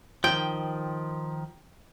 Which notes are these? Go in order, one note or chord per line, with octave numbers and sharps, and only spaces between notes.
D#3 F3 G5